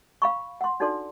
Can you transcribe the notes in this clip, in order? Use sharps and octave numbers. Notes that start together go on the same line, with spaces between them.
F5 B5 C#6
F#5 C6
D4 D#4 F#4 A4 D5 C6